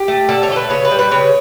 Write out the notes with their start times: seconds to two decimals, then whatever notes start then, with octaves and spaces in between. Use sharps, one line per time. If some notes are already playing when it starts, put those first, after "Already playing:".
Already playing: G4
0.08 A3
0.29 D3 A4
0.43 C#5
0.49 A3 A4
0.56 B4
0.69 C#3 C#5
0.85 B4
0.91 G3
0.99 B4
1.11 C#3 C#5